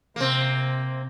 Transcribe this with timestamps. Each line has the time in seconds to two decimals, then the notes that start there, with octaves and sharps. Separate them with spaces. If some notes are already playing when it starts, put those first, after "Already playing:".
0.16 C3 A#3 C4